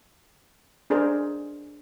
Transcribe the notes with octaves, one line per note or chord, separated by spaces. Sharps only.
D4 G#4 A#4 C5 D5